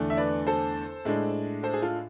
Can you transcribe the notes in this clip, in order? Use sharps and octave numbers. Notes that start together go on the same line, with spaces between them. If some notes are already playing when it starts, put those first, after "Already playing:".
Already playing: E2 D3 A3 D4
E5
B4 D5
A4 C5
A2 G#3 D4
A4 C5
G#4
F4 A4